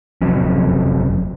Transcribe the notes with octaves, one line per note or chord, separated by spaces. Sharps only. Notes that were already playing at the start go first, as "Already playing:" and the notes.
F1 F2 F#3 C#4